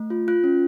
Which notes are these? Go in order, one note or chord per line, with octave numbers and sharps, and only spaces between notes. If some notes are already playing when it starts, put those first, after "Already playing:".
Already playing: A3
F4
F4 F#6
C#4